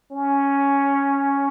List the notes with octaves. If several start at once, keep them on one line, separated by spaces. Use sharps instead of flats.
C#4